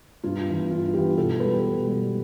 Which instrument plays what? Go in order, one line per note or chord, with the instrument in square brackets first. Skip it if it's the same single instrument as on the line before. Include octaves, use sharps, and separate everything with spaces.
[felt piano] G2 F4
E3 B3
G2 F4
E3 B3 G4
B2 A4
G3 B3 B4
G4
B2
G3 B3